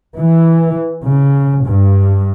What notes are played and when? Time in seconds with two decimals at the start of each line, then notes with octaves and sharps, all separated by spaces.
0.20 E3
1.05 C#3
1.66 G2